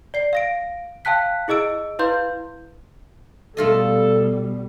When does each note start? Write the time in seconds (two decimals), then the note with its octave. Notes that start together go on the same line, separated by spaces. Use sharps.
0.14 D5 C7
0.33 F5 A#6 D7
1.05 F5 G5 A5 F#6 B6
1.48 E4 G#4 D#5 E6 D7
1.99 E4 B4 F5 C6 G6
3.57 B2 G3 A3 F4 A4 D#5